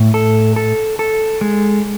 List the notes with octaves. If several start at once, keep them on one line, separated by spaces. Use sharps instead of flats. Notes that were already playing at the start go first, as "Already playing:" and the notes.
Already playing: A2
A4
A4
A4
G#3